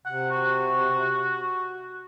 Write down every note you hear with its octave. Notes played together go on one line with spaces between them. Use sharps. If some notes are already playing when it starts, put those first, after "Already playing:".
C3 F#5
F#4